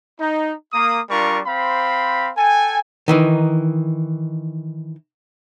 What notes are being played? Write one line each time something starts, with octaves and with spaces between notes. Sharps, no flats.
D#4
A#3 D#6
G3 D4 F4 A#4 C#6
C4 C5 F5 B5
A4 G5 G#5
D#3 E3 D#4